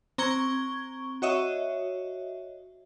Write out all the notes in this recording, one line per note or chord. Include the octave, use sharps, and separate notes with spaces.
C4 A#5 C#6 G#6 G7
F#4 C#5 D#5 E5